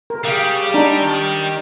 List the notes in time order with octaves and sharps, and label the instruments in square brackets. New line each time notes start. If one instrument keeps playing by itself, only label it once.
[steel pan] A#4
[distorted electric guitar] G3 [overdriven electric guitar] G#4 F5
[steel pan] D4 D#4 [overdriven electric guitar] A5 A#5
[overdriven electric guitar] D#3